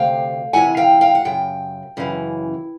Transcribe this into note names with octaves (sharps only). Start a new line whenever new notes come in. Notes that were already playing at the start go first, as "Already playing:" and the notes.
Already playing: D2 C3 F5 G5
D2 C3 E3 F#5 G#5
F5 G5
F5 G5
F#5
F#2 C#3 G5
F#2 C#3 E3